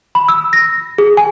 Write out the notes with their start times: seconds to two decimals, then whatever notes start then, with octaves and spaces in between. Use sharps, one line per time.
0.15 B5
0.28 E6
0.53 A#6
0.98 G#4
1.17 G#5